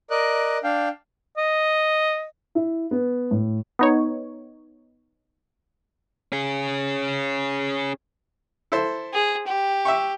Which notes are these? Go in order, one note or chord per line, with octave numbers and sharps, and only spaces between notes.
A#4 D5 D#5 F#6
D4 F5 G5
D#5
E4
B3
A2
B3 D#4 C#5
C#4 G#4
E4 A4 C5
G#4
G4
E5 G5 C#6